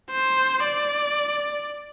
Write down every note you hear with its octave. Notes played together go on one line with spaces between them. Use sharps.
C5
D5